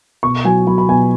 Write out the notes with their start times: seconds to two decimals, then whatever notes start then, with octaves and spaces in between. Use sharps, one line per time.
0.23 B2 C#6
0.45 F#3 G#5
0.67 F#3 B5
0.78 B5
0.88 B2 G#5